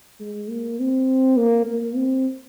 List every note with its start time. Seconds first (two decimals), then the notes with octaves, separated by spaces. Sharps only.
0.20 G#3
0.50 A#3
0.80 C4
1.37 A#3
1.66 A#3
1.96 C4